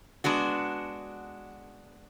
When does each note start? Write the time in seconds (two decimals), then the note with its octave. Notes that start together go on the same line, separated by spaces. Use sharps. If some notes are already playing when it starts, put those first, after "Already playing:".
0.24 G#3 B3 D4 F#4